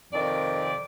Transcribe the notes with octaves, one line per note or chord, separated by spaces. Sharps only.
F2 C3 D#3 D5